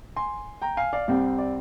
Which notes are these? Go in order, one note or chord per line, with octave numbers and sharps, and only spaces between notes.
G#5 C6
G5 A#5
F5 G#5
D5 F5
C2 C3 G3 C4 D5
D5